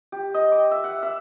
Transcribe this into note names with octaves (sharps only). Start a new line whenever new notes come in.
G4
D#5
D6
E5
F#5
E5